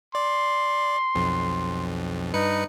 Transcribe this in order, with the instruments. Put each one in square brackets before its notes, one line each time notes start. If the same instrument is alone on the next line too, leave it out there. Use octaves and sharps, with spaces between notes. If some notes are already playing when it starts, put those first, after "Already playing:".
[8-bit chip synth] D5 [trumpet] C6
[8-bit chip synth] B1 F2
[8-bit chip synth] G2 B4 C#7 [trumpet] D#4